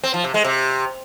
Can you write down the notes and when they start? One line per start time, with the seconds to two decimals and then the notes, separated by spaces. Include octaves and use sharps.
0.04 C4
0.14 F3
0.24 C3
0.34 G#3
0.44 C3